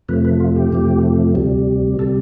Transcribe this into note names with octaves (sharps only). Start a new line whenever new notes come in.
F2 C3 F3 A3 B4
B4
F4
G4
F2 C3 F3 A3
D2 C3 G3
C3 G3 A4